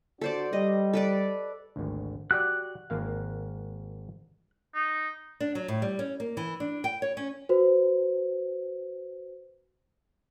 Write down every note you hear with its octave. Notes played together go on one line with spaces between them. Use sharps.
D4 F#4 A4 C5 D5
G3 D#5
A4 B4 D5
G#1 D2
F#4 G4 D5 F#6
G#1 A#3 F5
D#4
D4
F#3
A2
G3
C#4
A#3
E3
D4
G5
C#5
C#4
F#4 B4 C5